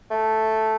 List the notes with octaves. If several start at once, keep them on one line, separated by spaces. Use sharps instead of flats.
A3